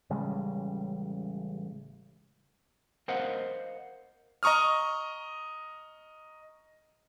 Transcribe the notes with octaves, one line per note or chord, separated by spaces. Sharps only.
A1 C#3 G3 G#3
A#4 C5 D#5 F5 F#5
D#5 A#5 C#6 D#6 F6